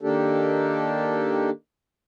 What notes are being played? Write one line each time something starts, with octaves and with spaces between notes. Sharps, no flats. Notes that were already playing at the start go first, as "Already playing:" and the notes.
D#3 A#3 D4 G4 A4